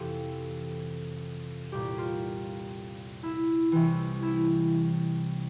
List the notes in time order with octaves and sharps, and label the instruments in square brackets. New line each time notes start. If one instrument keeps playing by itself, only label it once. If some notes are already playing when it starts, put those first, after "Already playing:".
Already playing: [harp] F2 C3 E3 G4 A4
C2 A#2 G4
F4
E4
C2 C3 E3
E4